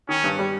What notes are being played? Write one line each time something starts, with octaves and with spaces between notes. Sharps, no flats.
D#3 C#4
G2
G3